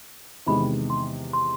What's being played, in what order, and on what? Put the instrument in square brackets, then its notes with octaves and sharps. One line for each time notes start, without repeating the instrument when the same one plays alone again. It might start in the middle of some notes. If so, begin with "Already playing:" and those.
[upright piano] E2 C3 D#3 G#3 [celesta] B5
[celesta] C6
C6